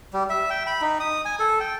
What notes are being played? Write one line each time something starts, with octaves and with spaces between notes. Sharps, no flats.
G3
E5
G5
B5
D#4
D#6
G#5
A4
G5